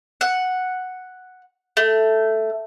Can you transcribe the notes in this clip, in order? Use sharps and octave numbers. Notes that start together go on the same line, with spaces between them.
F#5
A3